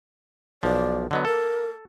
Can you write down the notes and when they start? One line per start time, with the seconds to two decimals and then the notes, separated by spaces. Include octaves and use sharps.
0.63 B1 F3 D5
1.11 D3 F#3 B3 D#5
1.25 A4 A#4